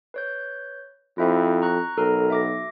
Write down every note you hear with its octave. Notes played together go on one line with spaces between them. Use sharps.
B4 C#5 G6
F2 E4 C5 E5
A#5 C#6 F#6
B1 A4 A#4 A#5
E5 D6 A#6